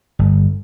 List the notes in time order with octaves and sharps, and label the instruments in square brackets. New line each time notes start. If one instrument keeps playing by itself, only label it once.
[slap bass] G1